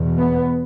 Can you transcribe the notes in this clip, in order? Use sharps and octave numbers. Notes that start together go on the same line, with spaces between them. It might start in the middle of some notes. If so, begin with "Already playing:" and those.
Already playing: E2 B2
B3